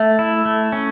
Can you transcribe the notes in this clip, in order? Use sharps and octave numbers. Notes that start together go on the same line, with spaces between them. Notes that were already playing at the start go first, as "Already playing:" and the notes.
Already playing: A3 E5
E4
A3
C#4